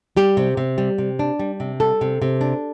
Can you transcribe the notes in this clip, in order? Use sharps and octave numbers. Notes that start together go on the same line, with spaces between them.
G3 G4
C3
C3
G3
C3
D4
G3
C3
G3 A4
C3
C3
D4